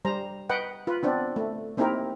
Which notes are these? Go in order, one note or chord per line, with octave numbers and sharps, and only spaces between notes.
G3 C5 A#5
B4 D#5 F#5 G5
F4 B4
B3 C4 D4
A3
A#3 C4 D#4 E4 G4 A#4